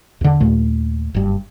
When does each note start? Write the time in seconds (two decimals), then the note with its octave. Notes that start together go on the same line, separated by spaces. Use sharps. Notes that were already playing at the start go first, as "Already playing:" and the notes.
0.21 E2 D3
0.40 D#2 A#2 A3
1.14 F#1 G2